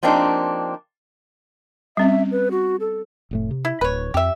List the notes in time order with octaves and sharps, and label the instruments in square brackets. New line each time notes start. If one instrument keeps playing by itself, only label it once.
[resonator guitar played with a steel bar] F3 A#3 C4 D4 D#4 G4
[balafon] G3 C4 C#4 [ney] E5
[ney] B4
F#4
A4
[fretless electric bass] F1 A2 A3
C3
[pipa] E4
[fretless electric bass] D1 [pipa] B4 C#5
[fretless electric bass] F2 [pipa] G4 E5